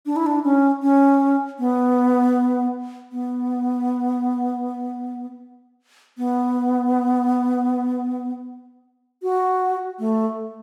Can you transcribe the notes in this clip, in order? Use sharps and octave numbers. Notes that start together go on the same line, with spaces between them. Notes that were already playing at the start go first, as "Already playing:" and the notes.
D4
E4
D4
C#4
C#4
B3
B3
B3
F#4
A3